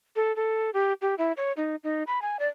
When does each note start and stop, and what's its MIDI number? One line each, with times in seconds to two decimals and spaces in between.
0.16 0.34 69
0.36 0.70 69
0.74 0.93 67
1.01 1.15 67
1.18 1.32 64
1.37 1.52 73
1.57 1.76 63
1.84 2.03 63
2.07 2.21 83
2.22 2.37 80
2.39 2.47 74